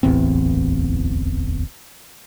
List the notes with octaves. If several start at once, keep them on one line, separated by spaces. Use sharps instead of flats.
D1 A1 E2 C4